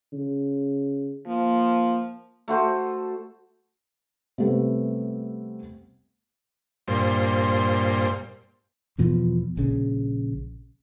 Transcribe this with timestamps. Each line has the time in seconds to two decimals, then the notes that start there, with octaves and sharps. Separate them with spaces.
0.13 C#3
1.27 F3 A#3
2.48 A3 F#4 C5
4.38 C3 G3 A3 B3
6.88 G2 A#2 C5
8.98 E2 B2 F3
9.57 A#1 C#3